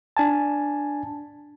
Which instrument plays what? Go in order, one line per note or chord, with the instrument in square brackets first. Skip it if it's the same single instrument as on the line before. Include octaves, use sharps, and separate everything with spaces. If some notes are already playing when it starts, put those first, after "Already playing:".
[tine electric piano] D4 G#5 A5